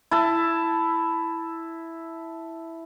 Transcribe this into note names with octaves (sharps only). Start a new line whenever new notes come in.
E4 A5